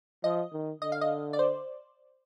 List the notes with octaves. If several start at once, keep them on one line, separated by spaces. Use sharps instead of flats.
F3 D#5
D#3
D3 D#5
F5
D#5
D5
C5